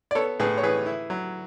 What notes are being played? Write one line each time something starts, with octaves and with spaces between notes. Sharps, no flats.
D5
B3 A4 C#5
A2 G#4 B4
C#5
E3 G#4 B4
E4
F#3